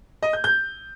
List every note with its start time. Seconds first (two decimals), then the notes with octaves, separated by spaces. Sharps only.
0.23 D#5
0.33 G6
0.44 G6